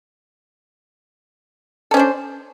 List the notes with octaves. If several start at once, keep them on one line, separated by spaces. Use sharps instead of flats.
C#4 D4 A4 C5